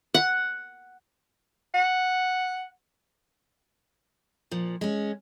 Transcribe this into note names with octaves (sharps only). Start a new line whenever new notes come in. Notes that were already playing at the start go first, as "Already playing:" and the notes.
F#5
F#5
A#2 F3
G#3 C#4